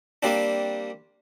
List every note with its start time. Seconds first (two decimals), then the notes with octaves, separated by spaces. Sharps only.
0.23 G3 A#3 C4 D4